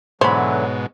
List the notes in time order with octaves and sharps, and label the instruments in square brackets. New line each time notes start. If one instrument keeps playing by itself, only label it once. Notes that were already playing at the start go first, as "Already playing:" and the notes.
[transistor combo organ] G#2 B2 [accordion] D3 E3 F#3 [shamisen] C5 [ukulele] C#5 B5